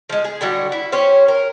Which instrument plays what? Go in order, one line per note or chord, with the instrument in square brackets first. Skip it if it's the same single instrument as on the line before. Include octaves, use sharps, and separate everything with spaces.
[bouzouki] F3 G#3
G#4
D3 F#3 G3 F#4
E4
C#4 G4 C5 C#5
A#4